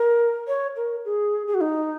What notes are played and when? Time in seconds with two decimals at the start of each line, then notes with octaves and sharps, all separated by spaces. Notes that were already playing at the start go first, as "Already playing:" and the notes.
Already playing: A#4
0.47 C#5
0.76 A#4
1.05 G#4
1.47 G#4
1.54 F#4
1.61 D#4